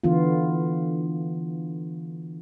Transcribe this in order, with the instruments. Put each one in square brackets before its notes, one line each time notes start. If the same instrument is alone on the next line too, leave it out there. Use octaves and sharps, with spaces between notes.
[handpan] D3 E3 B3 F4